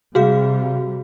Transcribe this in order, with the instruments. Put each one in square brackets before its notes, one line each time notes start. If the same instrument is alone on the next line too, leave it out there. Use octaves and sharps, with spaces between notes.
[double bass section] C3 G3 [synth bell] F#4 G#4 F5